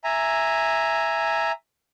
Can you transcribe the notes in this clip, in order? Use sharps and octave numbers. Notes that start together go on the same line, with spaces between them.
E5 G#5 A#5